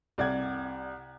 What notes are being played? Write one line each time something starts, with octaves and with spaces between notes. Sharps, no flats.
C2 D5 F#5 G#6